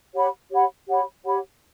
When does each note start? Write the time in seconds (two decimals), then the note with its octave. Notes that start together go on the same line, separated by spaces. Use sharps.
0.13 G4 C#5 F#5 B5
0.50 G4 C#5 F#5 B5
0.87 G4 C#5 F#5 B5
1.24 G4 C#5 F#5 B5